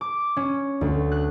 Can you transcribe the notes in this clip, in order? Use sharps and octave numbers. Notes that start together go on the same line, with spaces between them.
D6
C#4
D2
F#6